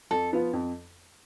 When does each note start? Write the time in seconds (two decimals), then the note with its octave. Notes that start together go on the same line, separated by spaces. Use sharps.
0.11 F2 A4
0.33 F3 B3 F4
0.53 F2